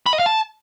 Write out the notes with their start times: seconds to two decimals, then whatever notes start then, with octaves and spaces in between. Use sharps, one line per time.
0.06 B5
0.13 D#5
0.19 F5
0.26 A5